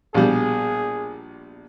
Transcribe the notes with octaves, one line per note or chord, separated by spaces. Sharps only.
A#1 B2 G3 G#4